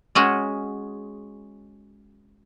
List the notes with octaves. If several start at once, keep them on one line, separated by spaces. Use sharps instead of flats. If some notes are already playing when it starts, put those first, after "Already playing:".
G#3 C#4 F#4 G#4